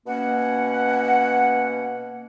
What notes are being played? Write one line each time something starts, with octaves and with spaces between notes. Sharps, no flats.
B2 A#3 C#4 F#5